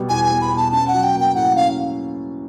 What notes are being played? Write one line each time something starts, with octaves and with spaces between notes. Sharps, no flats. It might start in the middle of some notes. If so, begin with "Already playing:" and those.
Already playing: B2 G3 B3
E2 G#5
G#5
B3
B5
B2
A5
C#4 A5
F#5
F#3
G5
A#3
G5
A2 F#5
C#4 F5